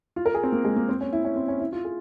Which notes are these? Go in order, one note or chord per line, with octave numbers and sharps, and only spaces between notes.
F4
A#4
G#4
C4
A#3
G#3
A#3
C4
C#4
E4
C#4
C4
C#4
E4
F4
G#4